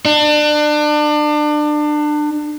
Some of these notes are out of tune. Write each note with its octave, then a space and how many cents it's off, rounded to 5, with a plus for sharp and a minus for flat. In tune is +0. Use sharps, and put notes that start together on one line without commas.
D4 +30